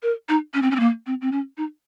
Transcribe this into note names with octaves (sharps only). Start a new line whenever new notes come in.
A#4
D#4
C#4
C4
C#4
C4
A#3
C4
C4
C#4
D#4